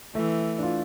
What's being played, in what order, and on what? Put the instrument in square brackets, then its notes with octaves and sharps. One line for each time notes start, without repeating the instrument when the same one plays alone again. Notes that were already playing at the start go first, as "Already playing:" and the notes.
[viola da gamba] E3 [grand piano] A3
[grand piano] D4 F4